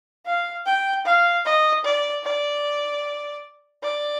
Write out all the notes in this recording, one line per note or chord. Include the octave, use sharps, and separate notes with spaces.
F5
G5
F5
D#5
D5
D5
D5